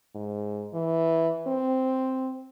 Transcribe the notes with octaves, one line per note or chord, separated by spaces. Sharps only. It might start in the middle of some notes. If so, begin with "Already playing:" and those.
G#2
E3
C4